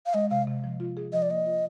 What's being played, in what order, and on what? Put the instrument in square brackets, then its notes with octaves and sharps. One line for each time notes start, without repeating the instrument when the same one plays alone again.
[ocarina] F5
[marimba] G#3 [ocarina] D#5
[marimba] C3 [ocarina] F5
[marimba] C3
F3
F4
G#4
[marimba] F3 [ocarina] D#5
[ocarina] D5
[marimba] A#3 [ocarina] D#5
[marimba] F4